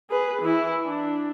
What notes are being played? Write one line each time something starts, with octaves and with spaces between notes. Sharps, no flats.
G#4 B4
E3 E4
D4